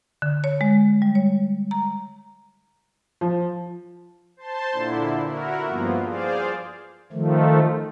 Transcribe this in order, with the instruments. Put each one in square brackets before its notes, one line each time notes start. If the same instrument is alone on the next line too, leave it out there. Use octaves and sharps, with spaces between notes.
[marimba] D3
C#5
G#3
G3
C#5
A#5
[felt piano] F3
[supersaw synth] C5 A5 C6
A#2 D3 E4
E4 F#4 A#4
G2 F3 A#3 B3 F4
G#4 C5 D5 F5
[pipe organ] D#3 F3 A3